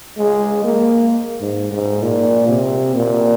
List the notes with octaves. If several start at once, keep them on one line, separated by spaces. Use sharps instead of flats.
G#3
A#3
G#2
G#2
A#2
C3
A#2